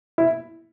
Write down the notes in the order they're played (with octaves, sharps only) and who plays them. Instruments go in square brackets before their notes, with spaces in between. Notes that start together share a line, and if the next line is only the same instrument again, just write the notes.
[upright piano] E4